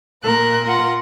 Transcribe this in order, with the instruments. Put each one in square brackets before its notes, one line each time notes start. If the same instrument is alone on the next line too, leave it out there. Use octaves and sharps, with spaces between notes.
[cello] A#2 A#4 [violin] A#3 F#6
[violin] F4 F#5